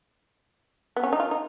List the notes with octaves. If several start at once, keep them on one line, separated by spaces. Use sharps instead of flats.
B3
C#4
D#4
F4
D#4